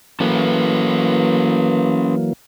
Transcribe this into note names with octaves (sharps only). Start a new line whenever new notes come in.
E3 F#3 A#3 C#4 A4 B4